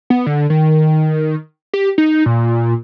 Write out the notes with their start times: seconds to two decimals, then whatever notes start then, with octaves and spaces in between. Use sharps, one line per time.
0.10 B3
0.26 D3
0.50 D#3
1.73 G4
1.98 D#4
2.26 A#2